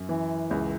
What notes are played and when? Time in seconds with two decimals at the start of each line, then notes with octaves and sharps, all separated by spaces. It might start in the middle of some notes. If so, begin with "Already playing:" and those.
Already playing: F#2
0.09 E3
0.51 C#2